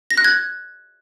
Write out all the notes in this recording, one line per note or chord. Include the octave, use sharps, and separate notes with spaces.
A#6
F#6
G#6